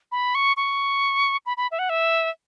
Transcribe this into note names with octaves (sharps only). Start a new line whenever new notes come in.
B5
C#6
C#6
B5
B5
E5
F#5
E5